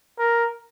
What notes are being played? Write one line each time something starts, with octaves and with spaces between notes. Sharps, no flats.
A#4